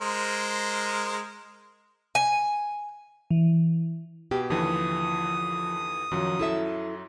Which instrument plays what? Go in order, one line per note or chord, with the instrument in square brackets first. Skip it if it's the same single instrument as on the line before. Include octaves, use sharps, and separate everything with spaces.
[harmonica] G#3 A#4 C5
[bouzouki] G#5
[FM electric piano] E3
[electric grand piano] B2 [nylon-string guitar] G4
[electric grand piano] D#2 D3 E3 [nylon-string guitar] F3 [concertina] D#6
[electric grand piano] F#2 F#3 [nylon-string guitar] D#3 F3
[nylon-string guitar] E4 A4 E5